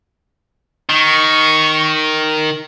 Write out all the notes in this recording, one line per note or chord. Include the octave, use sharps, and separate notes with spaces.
D#3 C#6